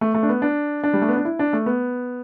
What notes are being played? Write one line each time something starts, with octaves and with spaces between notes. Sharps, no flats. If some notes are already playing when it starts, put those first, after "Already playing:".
A3
A3
D4
B3
D4
D4
G3
A3
B3
D4
E4
D4
A3
B3